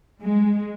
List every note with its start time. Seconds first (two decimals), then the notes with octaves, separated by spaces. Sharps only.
0.21 G#3